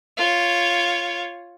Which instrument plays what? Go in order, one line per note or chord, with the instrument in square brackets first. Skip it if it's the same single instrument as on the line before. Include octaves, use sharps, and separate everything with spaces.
[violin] F4 C#5